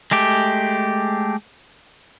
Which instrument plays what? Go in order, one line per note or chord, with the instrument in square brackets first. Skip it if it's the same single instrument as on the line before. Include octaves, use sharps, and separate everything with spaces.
[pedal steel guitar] G#3 A3 G4